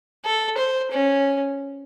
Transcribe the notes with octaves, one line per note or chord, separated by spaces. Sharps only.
A4
C5
C#4